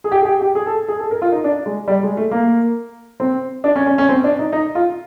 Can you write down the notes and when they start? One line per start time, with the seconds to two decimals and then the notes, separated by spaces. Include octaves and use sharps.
0.04 G#4
0.12 G4
0.21 G#4
0.25 G4
0.41 G4
0.55 G#4
0.66 A4
0.88 G#4
0.99 A4
1.11 A#4
1.22 F4
1.32 D#4
1.44 D4
1.66 G#3
1.88 G3
2.03 G#3
2.17 A3
2.31 A#3
3.20 C4
3.64 D4
3.76 C#4
3.86 C#4
3.98 C#4
4.09 C4
4.24 D4
4.39 D#4
4.52 D#4
4.75 F4